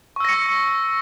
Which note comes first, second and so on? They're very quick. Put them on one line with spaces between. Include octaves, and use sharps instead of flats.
C#6 E6 A#6 C#7